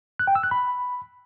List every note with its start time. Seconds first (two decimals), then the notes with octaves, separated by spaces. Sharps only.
0.19 F#6
0.27 G5
0.35 E6
0.43 F#6
0.51 B5